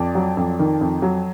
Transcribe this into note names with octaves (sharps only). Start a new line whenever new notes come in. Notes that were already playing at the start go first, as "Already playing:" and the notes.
Already playing: F2 D5
F#3
F2
D#3
F2
F#3